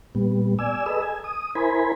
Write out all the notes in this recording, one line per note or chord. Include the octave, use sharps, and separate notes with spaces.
A#2 G3 B3
D5 G#5 E6
G#4 A4 B4 D#5 E6
G#5
D#6
E4 A#4 C5 G#5 B5